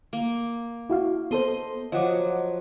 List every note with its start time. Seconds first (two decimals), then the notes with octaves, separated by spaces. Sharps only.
0.13 A#3
0.90 E4 F#4 F5
1.31 B3 A4 C5 D#5 C6
1.92 F3 F#3 D#5 F#5 D6